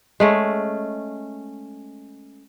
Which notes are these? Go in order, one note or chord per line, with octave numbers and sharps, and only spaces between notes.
G#3 A3 C#4